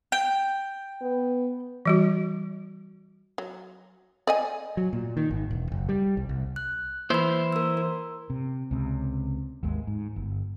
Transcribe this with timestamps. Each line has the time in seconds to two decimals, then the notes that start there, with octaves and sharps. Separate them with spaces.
0.12 G5
1.01 B3
1.86 E3 G3 F#4
3.38 F#3
4.27 D5 D#5 G#5
4.77 F#3
4.93 A#2
5.17 D#3
5.31 G#1
5.51 E1
5.72 F#1
5.89 G3
6.17 C2
6.29 C2
6.56 F#6
7.10 E3 A#3 E4 B4 C5 B5
7.52 A#4 E6
7.77 A#4
8.30 C3
8.71 C#2 C3
9.63 G#1 D#2 G#3
9.87 G#2
10.16 G1